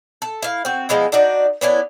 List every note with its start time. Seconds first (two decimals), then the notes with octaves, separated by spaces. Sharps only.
0.22 A4
0.42 E4 F5
0.65 C4 F#4
0.89 F3 G#3 B3 E4
1.12 D4 D#4 F#4 D5
1.61 B3 C#4 D4 E4